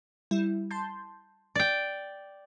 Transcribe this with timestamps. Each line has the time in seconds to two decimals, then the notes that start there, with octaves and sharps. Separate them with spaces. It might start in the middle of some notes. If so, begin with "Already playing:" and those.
0.31 G3 E4
0.71 A5 C6 G6
1.55 D5 G5